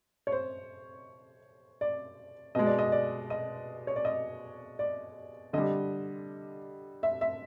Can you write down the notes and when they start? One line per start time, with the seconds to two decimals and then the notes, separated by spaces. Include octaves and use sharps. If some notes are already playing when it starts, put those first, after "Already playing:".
0.27 C#5
0.32 C5
1.81 D5
2.55 B2 G#3 D#5
2.67 D5
2.79 D#5
2.92 D5
3.30 D#5
3.87 C#5
3.96 D5
4.05 D#5
4.79 D5
5.53 D3 G3 D#5
7.03 E5
7.21 E5